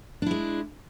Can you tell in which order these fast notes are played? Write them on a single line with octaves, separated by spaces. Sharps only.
D4 E4 G#3